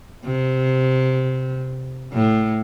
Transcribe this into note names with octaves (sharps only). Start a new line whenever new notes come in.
C3
A2